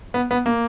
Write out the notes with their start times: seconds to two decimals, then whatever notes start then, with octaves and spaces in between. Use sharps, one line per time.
0.14 B3
0.31 B3
0.46 A#3